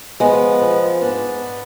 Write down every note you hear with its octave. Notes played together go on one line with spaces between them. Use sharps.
F3 G#3 B3
F3
G#2 B3 D4